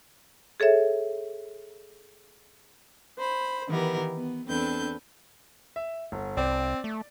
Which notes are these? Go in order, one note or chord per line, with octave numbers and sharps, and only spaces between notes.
G#4 A4 C#5 E5
C5 B5
D#3 E3 B3 G4 A#4
B3
E2 C4 D4 A4 B4 G6
E5
G1
C2 C4 D5
A3